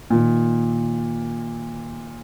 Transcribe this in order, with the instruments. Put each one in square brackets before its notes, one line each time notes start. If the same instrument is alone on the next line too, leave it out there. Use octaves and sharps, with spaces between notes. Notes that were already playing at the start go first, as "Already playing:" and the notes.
[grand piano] A#2 D#3